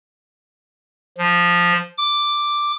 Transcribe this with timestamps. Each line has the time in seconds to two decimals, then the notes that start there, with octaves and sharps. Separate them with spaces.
1.18 F3
1.98 D6